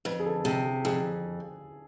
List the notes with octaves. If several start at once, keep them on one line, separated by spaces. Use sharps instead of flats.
F2 B4
G#4
A4
C3 G#4
G#4
F2 G#4